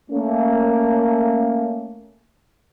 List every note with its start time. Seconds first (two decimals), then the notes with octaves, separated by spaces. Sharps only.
0.10 A3 A#3 C#4